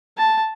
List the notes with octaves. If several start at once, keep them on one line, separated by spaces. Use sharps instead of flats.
A5